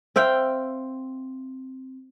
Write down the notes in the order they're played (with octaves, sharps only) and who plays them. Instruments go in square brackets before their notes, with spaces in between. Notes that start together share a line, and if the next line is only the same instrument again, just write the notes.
[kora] C4 E5 F5 G5